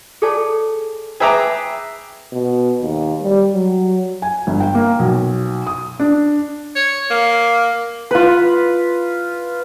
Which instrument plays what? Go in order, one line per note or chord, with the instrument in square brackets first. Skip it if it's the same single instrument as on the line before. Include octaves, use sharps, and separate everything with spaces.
[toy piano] G#4 A4 C#5 D5 G#5 A5
[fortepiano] G#4 B4 E5 G5 A#5 D6
[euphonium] B2
D#2
G3
F#3
[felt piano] G#5
G1
G5
A#3
B1
D#6
D4
[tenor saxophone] C#5
A#3
[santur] F4 B4